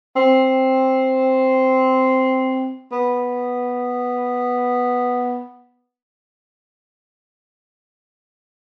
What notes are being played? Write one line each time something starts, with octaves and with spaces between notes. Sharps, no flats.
C4
B3